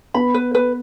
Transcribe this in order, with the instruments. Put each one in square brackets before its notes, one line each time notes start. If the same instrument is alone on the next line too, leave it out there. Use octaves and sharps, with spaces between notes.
[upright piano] B3 [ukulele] B5
[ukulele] B4
B4